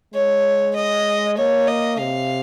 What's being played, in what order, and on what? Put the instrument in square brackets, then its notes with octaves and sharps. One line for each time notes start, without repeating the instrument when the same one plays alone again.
[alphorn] G#3 [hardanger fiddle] C#5
[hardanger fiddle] D#5
[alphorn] A#3 [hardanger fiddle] C#5
[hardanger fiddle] D#5
[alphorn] C3 [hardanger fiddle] F5